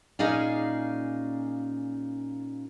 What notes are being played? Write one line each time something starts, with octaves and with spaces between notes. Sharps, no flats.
A#2 C#4 D#4 G#4 D5 F5